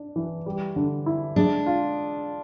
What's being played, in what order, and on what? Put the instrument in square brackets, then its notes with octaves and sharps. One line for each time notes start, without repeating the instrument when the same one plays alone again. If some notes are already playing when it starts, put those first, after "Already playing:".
Already playing: [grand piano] D4
E3
G3
D3
E4
[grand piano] G#3 [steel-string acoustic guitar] D4
[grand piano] F4